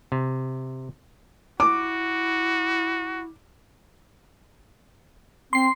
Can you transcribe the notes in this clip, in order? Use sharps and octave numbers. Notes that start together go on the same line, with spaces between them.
C3
E4 F#4 D6
C4 C6 C7